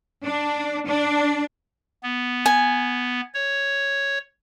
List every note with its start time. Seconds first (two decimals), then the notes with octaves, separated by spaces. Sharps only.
0.24 D4
0.88 D4
2.03 B3
2.46 G#5
3.34 C#5